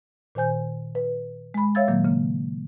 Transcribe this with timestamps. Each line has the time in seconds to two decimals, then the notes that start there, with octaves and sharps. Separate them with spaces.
0.35 A#2 D#3 C5 G#5 G6
0.95 B4
1.54 G#3 B5
1.75 C#5 E5 F5 E6 G#6 A6
1.88 A#2 D#3 F#3 A#3
2.05 C#3 A#3